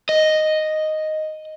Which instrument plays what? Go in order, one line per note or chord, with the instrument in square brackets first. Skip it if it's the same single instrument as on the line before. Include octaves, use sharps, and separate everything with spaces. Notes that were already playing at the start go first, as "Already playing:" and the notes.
[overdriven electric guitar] D#5